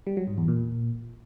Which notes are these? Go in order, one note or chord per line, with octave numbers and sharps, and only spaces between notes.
G3
F#3
G#2
E2
A#2